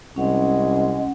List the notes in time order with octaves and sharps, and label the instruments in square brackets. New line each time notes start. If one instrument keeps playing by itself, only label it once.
[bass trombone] C2 [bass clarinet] G#3 [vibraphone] C#4 F#5